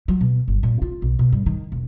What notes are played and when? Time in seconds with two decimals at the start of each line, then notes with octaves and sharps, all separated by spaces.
0.08 F#3
0.21 B2
0.48 G1
0.63 A#2
0.82 F4
1.02 B1
1.19 B2
1.32 G2
1.46 D#3
1.72 E1